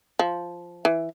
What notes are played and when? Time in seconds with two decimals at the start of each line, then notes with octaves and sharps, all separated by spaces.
0.19 F3
0.85 E3